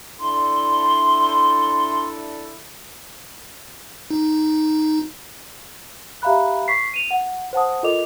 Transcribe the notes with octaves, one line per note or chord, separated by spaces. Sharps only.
D4 E4 A4 C6
D#4
G4 E5 F5 A#5 B5 F#6
C#6 B6 C7
D#7 F7
F#5
C5 F#5 A5 D#6
F4 A4 A#4 D#5 D6 F7